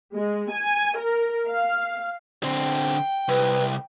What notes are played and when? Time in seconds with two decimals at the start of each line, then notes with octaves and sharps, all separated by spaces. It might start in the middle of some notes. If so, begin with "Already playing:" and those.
0.14 G#3
0.51 G#5
0.97 A#4
1.47 F5
2.43 D3 C4 G5
3.28 C2 B4